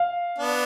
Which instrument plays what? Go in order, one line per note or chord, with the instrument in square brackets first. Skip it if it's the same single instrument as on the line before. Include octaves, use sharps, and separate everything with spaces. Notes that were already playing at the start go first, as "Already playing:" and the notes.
Already playing: [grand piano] F5
[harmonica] B3 D4